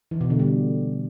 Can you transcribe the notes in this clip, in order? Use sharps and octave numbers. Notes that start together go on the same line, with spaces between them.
E3
B2
D3
G3